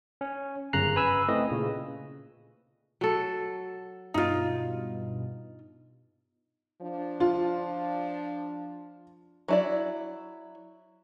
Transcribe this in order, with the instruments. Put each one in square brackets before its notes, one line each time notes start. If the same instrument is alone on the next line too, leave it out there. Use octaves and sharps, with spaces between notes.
[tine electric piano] C#4
G1 F#2 C#3 A#5 F#6 C7
B4 G#5 B5 E6
A3 C4 E4 B4 D#5
A#2 C#3
[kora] F#3 A4
[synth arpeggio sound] G2 B2 [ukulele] D#4 F4
[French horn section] F3 D4
[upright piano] F4
[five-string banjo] F#3 E4 D5